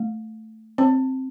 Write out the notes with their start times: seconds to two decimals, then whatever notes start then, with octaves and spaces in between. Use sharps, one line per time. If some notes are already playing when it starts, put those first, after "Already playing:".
Already playing: A3
0.78 C4